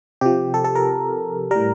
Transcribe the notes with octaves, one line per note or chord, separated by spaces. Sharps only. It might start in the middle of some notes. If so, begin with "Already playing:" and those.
C3 F3 G4
A4
A4
A#4
A2 G3 A#4